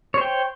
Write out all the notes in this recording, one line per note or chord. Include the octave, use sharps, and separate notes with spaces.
C5 C#5 G5